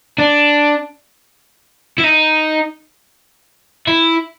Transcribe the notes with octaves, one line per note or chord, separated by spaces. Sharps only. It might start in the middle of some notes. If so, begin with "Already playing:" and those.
D4
E4
D#4
E4